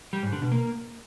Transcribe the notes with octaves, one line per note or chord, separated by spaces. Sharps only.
G3
G#2
D3
B2
A#3